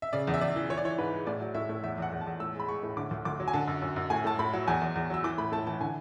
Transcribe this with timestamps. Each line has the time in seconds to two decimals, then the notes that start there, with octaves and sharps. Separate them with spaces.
0.02 E5
0.13 C#3 D5
0.27 E2
0.34 E5
0.41 E2 D5
0.56 E3
0.70 E3 C#5
0.77 D5
0.85 E3 C#5
0.98 G#2 B4
1.13 G#3
1.27 A2 D5
1.41 F#3
1.55 A2 E5
1.69 A2
1.83 E2 E5
1.98 E2 F#5
2.12 E2
2.21 A5
2.26 E2
2.40 A2 E6
2.54 G#3
2.60 B5
2.69 G#3 C#6
2.83 A2
2.97 D3 D6
3.11 D2
3.25 D2 D6
3.40 F#3
3.48 G#5
3.53 D3 A5
3.68 F#2
3.82 F#2
3.96 F#2
4.10 A2 G#5
4.24 A2 A5
4.39 A2 B5
4.53 F#3
4.67 E2 G#5
4.81 E2
4.96 E2
5.10 F#3 E6
5.24 E3 D6
5.38 A2 B5
5.52 A2 A5
5.67 E3 A5
5.80 D3 G#5